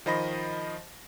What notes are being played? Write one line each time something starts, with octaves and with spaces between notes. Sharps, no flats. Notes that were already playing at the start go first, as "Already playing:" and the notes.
D#3 F3 C5 D#5 B5 A#6